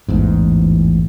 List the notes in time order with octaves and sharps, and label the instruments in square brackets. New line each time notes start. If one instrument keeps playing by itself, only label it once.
[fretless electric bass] A1 E2 G#2